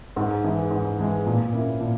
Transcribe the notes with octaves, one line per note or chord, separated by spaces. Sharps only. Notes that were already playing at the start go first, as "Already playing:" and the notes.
G#2
E3 G#3
G#2
E3 G#3
A#2
A#3 C#4 E4
A#2